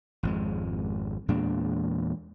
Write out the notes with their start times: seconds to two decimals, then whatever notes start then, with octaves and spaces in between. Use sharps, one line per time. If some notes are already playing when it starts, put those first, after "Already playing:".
0.23 G#1 F2 G#3
1.28 E2 A#2 G#3 D4